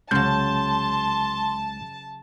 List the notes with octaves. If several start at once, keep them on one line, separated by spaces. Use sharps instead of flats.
C2 C#3 F#3 G#3 A5 C6 G6